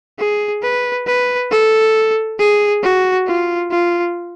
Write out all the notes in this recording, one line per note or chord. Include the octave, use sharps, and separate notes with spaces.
G#4
B4
B4
A4
G#4
F#4
F4
F4